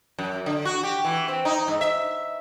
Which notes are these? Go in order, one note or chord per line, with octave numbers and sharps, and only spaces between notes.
F#2
D3
F#4
G4
E3
C4
D#4
G#2
E5